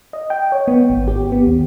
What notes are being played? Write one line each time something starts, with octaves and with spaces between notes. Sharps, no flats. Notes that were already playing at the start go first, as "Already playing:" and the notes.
D#5
G5
C#5
B3
G#1
G4
B3
D#2